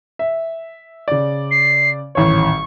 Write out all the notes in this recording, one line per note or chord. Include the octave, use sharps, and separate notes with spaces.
E5
C#3 D5
C7
D#1 A1 C#5 C#6